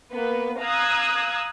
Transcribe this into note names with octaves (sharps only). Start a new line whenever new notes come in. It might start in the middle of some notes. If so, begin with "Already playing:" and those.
A#3 B3 B4
F5 A#5 D#6 E6 F#6 G#6